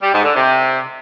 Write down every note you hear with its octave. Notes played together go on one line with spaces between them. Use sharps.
G3
G#2
D3
C3